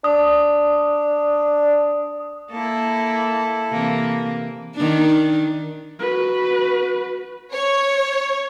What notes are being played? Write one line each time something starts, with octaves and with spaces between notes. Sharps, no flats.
D4 D#6
A#3 E4 A4
C3 E3 A#3
D#3 D4
F#4 B4
C#5